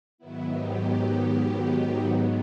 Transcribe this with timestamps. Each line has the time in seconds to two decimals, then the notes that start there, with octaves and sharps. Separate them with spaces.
0.18 G#2 D#3 F#3 B3 E4
0.48 G4